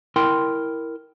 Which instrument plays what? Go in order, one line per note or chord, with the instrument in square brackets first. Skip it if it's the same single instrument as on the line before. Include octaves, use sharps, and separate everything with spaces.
[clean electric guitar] E4 A#4 G5 C6